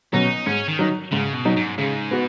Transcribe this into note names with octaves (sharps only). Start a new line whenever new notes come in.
B2 F#3 C#4 D#4
G#2 C#4
D#3
F#3 D#4
G#2 C#3
B2
F#3 D#4
G#2
G#2 C#3
B3 F#4